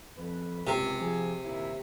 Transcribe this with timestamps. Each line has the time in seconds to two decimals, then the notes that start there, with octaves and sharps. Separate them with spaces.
0.18 F2 B4
0.67 C#2 F#2 C3
1.00 F3 G#4
1.45 D#2 A#2 E4